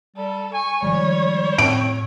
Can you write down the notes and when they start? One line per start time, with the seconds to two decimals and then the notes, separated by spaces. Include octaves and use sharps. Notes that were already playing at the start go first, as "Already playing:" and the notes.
0.16 G3 A4
0.54 G#5 C#6
0.83 D#3 F3 G3 G#3 C#5
1.58 A2 C4 D7